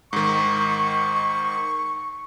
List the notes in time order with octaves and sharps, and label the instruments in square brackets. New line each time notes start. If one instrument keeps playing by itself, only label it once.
[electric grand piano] G#2 D#3 [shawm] C#6